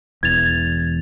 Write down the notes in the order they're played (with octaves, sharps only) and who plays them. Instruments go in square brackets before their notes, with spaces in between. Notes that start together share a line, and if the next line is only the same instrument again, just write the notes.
[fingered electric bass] E1 E2 E3 [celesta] G#6 A6 F7